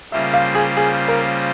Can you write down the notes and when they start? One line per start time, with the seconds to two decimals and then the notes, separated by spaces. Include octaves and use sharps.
0.12 C#3 G3 A#3 F4 C5 E5
0.34 F5
0.55 G#4
0.77 G#4
1.08 A#4